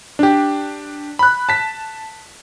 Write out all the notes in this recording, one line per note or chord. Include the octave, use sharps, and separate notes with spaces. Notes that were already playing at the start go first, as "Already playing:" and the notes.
D4 G4
B5 F#6
A5 B6